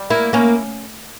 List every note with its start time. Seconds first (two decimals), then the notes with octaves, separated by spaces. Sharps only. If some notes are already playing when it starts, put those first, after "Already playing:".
Already playing: G3
0.10 A#3 E4
0.33 A#3 C#4